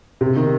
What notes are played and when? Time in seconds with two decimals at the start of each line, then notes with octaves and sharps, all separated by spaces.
0.21 C3
0.36 D#3